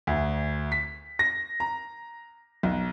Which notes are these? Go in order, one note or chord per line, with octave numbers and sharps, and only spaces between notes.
D2
B6
A#6
A#5
B1